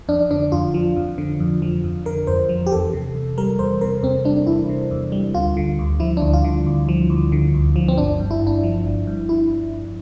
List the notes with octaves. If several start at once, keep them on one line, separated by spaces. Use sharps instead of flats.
F2 D4
D3 D4
F2 F4
F3
F2
D3
F2
F3
F2
D3 A#4
F2 C5
F3
G4
E2 A4
C3
E2
G3 A#4
E2 C5
C3 A#4
E2 C4
G3 D4
E2 E4
C3
E2
G3
D2 F4
D3
D2
F3 E4
D2 D4
F4
D3
D2
F3
D2
D3
D2
F3
C4
G1 D4
G2
E4
G1
D4
F3
G1
G2
E4